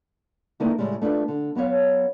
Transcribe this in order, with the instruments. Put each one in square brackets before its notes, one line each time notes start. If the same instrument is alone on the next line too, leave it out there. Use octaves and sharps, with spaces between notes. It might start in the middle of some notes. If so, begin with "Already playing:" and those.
[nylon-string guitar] D3 A3 A#3 D#4 E4 B4
A2 C#3 G3 G#3
A3 D4 E4 F4 B4
D3
F#3 B3 C#4 C#5 F5